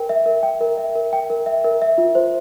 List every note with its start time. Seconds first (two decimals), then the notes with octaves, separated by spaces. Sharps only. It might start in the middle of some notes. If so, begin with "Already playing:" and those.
Already playing: A#4 G5
0.09 E5
0.26 A#4
0.43 G5
0.61 A#4
0.77 E5
0.95 A#4
1.13 G5
1.30 A#4
1.46 E5
1.65 A#4
1.82 E5
1.98 F4
2.15 C5